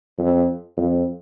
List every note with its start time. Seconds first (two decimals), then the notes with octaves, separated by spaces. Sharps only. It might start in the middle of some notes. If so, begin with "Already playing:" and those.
0.18 F2
0.77 F2